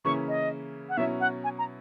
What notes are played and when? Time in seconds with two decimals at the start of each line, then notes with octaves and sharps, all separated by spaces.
0.05 C#3 E3 A#3 C#4 E4 C#6
0.28 D#5
0.89 F#5
0.97 B2 F#3 C#4 E4 E5
1.20 F#5
1.44 G#5
1.59 A#5